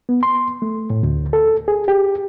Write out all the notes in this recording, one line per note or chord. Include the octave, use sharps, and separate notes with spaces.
B3
C6
A3
A2
D2
A4
G#4
G4